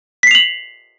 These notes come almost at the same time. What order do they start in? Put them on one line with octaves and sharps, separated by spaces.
B6 C7 F7 F#7